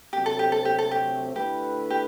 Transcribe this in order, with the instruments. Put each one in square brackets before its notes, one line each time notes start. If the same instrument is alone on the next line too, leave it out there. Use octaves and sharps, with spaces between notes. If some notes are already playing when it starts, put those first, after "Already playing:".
[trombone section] D2 C3 F#3 A3 C4 [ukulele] G4
[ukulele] A4
G4
A4
G4
A4
G4
[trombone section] D3 A3 E4 B4 [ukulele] G4
[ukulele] G4